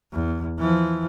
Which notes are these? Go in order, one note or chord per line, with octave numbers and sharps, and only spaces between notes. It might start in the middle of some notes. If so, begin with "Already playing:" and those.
E2
E3 F3